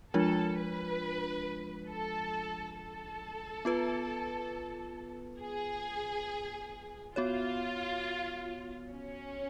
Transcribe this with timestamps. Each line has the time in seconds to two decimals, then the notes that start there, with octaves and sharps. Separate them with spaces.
0.13 F3 G#3 D4 F4 A4
0.58 B4
1.90 A4
2.77 A4
3.65 B3 F4 B4
5.40 G#4
7.16 B3 F4 F#4 C#5
8.92 C#4